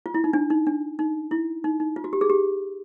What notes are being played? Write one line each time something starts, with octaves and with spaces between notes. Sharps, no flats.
F4
E4
D#4
D4
D#4
D4
D#4
E4
D#4
D#4
F4
F#4
G4
G#4
G4